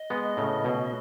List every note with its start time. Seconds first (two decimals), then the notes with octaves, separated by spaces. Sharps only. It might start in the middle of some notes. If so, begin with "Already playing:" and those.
Already playing: D#5
0.10 G#3 B3
0.37 A2 C#3
0.64 B2